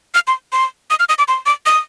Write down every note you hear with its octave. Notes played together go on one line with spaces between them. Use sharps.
F6
C6
C6
D#6
F6
D#6
D6
C6
D6
D#6